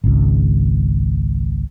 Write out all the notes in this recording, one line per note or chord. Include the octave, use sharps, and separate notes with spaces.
G#1 C#2